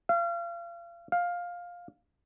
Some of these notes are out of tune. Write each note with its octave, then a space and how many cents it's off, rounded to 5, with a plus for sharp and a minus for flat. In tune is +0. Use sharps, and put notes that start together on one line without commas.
F5 -35
F5 +10